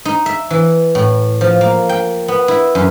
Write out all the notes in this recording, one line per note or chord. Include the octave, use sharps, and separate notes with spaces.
D#4
E5
E3
A2
F3
A#3
G5
B3
E4
F#2